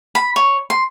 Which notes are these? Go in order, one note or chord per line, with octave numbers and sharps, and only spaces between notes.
B5
C#5
C6